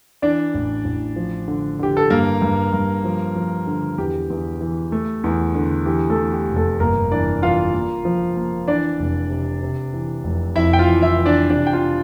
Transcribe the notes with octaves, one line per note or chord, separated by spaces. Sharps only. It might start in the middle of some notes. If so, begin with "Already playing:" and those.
E3 D4 D5
A1
A1
F3
D3
D3 G4
A4
G2 A#3 A#4
G2
G2
F3
F3
D3
E2 G4
E2
E3
A3
E2
D3
E3 G4
A3 A4
E3
G4
F1
A3 A4
G1 A#3 A#4
E3 D4 D5
E3 F4 F5
A#3
F3
A#3
E3 D4 D5
F1
C3
C3
E3
F1
F2 E4 E5
G5
F4 F5
E3
E4 E5
E3
D4 D5
C3 D4 D5
G5
F4 F5